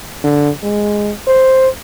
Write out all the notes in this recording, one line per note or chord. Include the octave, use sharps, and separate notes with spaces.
D3
G#3
C5